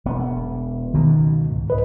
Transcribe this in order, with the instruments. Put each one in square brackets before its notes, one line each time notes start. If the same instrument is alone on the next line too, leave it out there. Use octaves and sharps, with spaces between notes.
[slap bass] E1 B3
[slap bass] C#2 B2 [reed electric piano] D#3
[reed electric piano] G#2
C2 B4 D#5